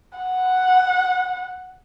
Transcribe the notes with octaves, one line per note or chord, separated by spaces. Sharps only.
F#5